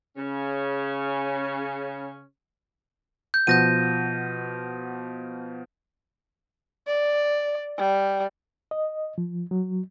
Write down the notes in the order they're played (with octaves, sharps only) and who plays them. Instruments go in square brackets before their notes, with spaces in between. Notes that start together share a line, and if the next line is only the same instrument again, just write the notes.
[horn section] C#3 C#4
[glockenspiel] G6
[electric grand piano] B2 F3 F#5 [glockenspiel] G6 A#6 D#7
[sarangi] D5
G3
[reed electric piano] D#5
F3
F#3